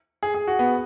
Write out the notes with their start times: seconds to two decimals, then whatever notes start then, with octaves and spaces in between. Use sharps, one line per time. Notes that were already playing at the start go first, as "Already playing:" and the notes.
0.23 G#4
0.34 G#4
0.47 F#4
0.59 B3